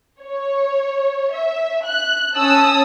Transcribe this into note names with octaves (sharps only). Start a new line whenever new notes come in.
C#5
E5
F#6
C#4 A5 D#6 E6